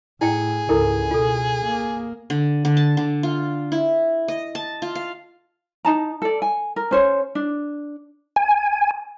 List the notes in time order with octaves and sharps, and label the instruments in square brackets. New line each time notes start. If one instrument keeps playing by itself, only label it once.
[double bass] A2 [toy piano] E4 G5 [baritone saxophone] G#4
[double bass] C#2 G#2 [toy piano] E4 A4 A#4
[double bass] B2 [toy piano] F4 A4
[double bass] A#3
[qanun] D3
D3
A5
D3
F4
E4
D#5
A5
F4
F5
[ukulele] D#4 A5 A#5
A4 D5
G#5
A#4
C#4 C5 C#5
D4
[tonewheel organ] G#5